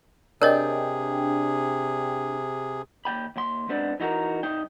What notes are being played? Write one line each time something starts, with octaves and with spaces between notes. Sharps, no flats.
C3 D4 G#4 A#4 C#5 D#5 G5
D#2 G5 B5
D#2 C6
G#2 B3 C4 D4
E3 D#4 F#4 A4 A#4
C2 D#4 G5